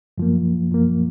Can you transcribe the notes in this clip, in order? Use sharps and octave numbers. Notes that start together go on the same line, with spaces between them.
F#2 F3 A#3
F#2 F3 A#3